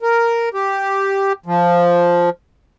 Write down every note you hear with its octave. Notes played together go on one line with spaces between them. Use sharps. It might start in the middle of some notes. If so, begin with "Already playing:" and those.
A#4
G4
F3